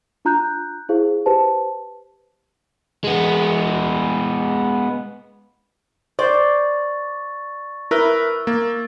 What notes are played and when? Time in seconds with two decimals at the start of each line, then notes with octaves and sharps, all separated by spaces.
0.25 D4 F4 A#5 F#6 G6
0.89 E4 G#4 C5 F5
1.26 G4 B4 C5 A5
3.04 G#3 B3
6.19 C5 D5 C#6 A6
7.91 E4 A#4 B4 E6 G7
8.47 A#3 A6